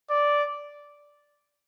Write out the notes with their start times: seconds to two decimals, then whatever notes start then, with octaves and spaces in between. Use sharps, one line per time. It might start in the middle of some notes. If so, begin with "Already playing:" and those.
0.11 D5